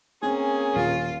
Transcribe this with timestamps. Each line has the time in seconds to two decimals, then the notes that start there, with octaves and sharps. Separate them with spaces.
0.23 A#3 C4 C#4 G#4
0.75 D#1 F4